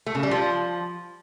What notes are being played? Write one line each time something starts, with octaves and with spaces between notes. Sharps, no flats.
A3
C#3
G3
F3